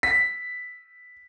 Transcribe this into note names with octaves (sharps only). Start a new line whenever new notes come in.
B6